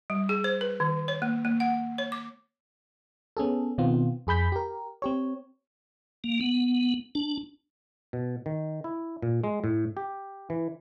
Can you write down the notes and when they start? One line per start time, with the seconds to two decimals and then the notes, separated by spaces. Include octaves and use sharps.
0.10 G3
0.29 G#4
0.44 C5
0.61 B4
0.80 D#3
1.08 C#5
1.22 A#3
1.45 A#3
1.60 F#5
1.98 C#5
2.12 D6
3.37 B3 C#4 G#4 A4
3.78 B2 D#3 B3 C4 F4
4.27 F2 G#4 B5 G6 B6
4.52 G4 A#4
5.02 C4 G4 C#5
6.24 A#3
6.41 B3
7.15 D4
8.13 B2
8.46 D#3
8.84 E4
9.22 A#2
9.44 G#3
9.64 A2
9.97 G4
10.50 E3